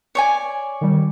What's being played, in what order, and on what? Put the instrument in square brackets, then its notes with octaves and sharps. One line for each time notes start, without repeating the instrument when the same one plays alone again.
[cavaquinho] C#5 D5 G#5
[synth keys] D#3 G3